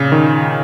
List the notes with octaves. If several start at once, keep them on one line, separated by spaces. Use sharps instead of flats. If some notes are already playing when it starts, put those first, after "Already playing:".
Already playing: A#2 C#3
D#3